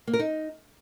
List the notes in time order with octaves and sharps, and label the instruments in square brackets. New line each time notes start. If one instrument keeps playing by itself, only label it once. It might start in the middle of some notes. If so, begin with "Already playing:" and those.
[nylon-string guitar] A#3
A#4
D#4